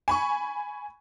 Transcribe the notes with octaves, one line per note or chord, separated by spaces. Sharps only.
G#5 B5 C#6